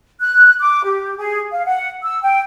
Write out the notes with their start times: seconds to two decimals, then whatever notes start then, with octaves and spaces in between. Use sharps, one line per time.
0.20 F#6
0.59 D6
0.84 G4
1.17 G#4
1.51 F5
1.65 F#5
2.02 E6
2.22 G5